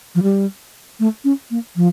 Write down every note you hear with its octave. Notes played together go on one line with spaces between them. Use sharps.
F3
G3
A3
C#4
A#3
F3